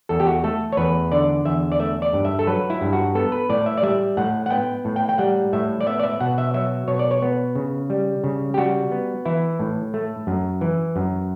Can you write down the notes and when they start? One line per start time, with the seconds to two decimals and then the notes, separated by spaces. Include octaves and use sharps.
0.09 E2 A4
0.20 G4
0.27 F#4
0.44 A3 A4
0.72 C#5
0.77 E2 B4
1.12 D3 D5
1.45 E2 E5
1.72 D5
1.80 A3 E5
2.02 D5
2.13 G2
2.25 E5
2.39 A4
2.47 F#3 B4
2.70 E4
2.81 G2
2.93 F#4
3.15 B3 A4
3.32 B4
3.50 A2 D5
3.66 E5
3.77 D5
3.83 G3 E5
4.17 A2 F#5
4.46 F#5
4.50 B3 G5
4.85 A2
4.96 G5
5.09 G5
5.18 G3 F#5
5.53 A2 E5
5.81 D5
5.86 B3 E5
6.00 D5
6.03 E5
6.21 B2 F#5
6.38 E5
6.54 F#3 E5
6.88 B2 C#5
6.99 D5
7.11 C#5
7.22 B3
7.55 C#3
7.90 G3
8.24 C#3
8.54 G4
8.58 G3 F#4
8.92 B3
9.25 E3 E4
9.59 A2
9.94 A3
10.27 F#2
10.61 E3
10.96 F#2